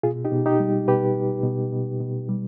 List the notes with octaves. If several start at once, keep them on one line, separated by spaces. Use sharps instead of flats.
B2 F4 G#4
D#4 G4
B2
D#4 G4
G3
B2 G4 B4
B2
B2
B2
B2
G3